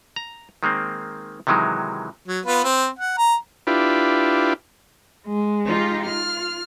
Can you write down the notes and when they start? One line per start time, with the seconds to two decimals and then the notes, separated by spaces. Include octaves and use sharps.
0.16 A#5
0.63 D#3 G#3 A#3 C4
1.47 C3 D#3 E3 F#3 G#3
2.28 F#3
2.45 B3 F4 B4
2.64 C4
2.99 F#5
3.18 A#5
3.67 D4 E4 F4 G4 B4
5.27 G#3
5.65 D#4 F4 G4
6.06 F4 F6